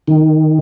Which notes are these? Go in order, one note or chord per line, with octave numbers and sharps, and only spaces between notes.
D#3